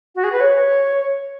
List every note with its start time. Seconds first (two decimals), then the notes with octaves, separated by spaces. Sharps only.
0.15 F#4
0.24 G#4
0.32 B4
0.40 C#5